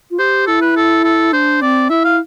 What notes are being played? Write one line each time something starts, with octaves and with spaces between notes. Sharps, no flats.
F4
G4 C5
E4 A4
B4
A4
A4
D4 C5
C4 D5
E4 E5
F5